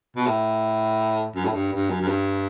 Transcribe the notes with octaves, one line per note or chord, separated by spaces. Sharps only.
B2
A2
F#2
A2
G2
G2
F#2
F#2
G2